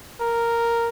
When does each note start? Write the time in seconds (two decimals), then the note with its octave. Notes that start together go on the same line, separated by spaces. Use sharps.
0.20 A#4